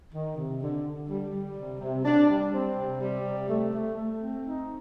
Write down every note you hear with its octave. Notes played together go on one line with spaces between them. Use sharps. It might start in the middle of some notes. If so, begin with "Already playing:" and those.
D#3
C3
D3
D3
G3
G3
C3
C3
D4
G3
C4
C3
G3
C3
A3
A3
A3
C4
D#4